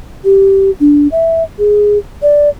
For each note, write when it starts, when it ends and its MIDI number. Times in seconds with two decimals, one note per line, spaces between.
0.25 0.70 67
0.80 1.08 62
1.12 1.43 76
1.59 1.98 68
2.22 2.49 74